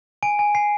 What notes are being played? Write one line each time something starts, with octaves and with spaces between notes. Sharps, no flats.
G#5 D7
G#5
G#5 C7